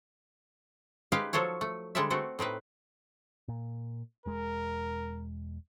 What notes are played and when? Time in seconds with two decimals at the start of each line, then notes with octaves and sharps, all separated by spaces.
1.12 G#3 D#4 G4 B4 F5
1.33 F3 F#3 A4 C5 C#5
1.61 A3
1.95 D3 G3 G#3 A4 D5 E5
2.10 A3 C4 F#4 A4
2.39 A2 C4 D#4 B4
3.48 A#2
4.26 E1 G#3 A#4